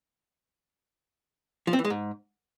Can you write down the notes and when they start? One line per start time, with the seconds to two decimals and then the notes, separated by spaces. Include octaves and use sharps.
1.67 F3
1.73 C4
1.79 E3
1.85 G#3
1.90 G#2